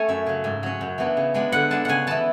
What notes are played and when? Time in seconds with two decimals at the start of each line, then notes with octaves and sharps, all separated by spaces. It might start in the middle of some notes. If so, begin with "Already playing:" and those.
Already playing: A3 C#4 G#5
0.08 F#2 E5
0.26 C#3 F#3
0.44 G#2
0.63 F#3 C#4
0.81 F#2
0.98 E3 B3 D4
1.17 C#3
1.34 G#3 B3 D4
1.52 D3 F#5
1.71 G#3 D4 A5
1.85 C#3 F#5 G#5
2.07 E3 B3 A5